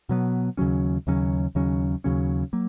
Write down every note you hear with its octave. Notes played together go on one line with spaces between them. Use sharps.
B2 F#3 B3
D#2 C#3 F#3 C#4
D#2 C#3 F#3 C#4
D#2 C#3 F#3 C#4
D#2 C#3 F#3 C#4
F#3 A#3